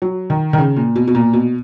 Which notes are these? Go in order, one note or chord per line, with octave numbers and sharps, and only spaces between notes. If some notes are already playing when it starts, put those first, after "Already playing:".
F#3
D#3
D#3
C#3
A#2
B2
B2
A#2
B2